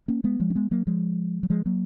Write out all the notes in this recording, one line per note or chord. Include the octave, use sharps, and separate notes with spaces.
A#3 C#4
G#3 B3
F3 G#3
C#4
G#3 B3
F#3 A#3
F3 G#3
F#3
F3 G#3
F#3 A#3